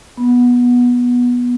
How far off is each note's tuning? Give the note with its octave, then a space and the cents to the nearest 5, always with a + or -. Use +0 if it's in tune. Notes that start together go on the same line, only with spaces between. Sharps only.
B3 -15